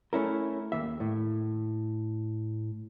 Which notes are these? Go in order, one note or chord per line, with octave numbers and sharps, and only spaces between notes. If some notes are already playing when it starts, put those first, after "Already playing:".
A3 C#4 E4 A#4
D#2 D#3 A#3 E5
A2